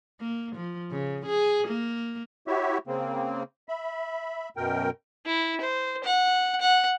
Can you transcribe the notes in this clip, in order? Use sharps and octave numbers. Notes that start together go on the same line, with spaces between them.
A#3
F3
C#3
G#4
A#3
E4 F#4 G4 C#5 E5
C#3 A#3 C4
E5 B5
F#2 B2 A#4 G5
E4
C5
F#5
F#5